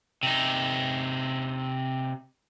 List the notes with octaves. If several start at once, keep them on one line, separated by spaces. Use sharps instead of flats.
C3 D#4